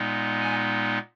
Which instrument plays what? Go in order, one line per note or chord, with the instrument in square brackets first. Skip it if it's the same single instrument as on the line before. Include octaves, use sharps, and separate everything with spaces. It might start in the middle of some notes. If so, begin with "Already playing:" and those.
Already playing: [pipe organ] A#2 G#3 B3 D#4
G#5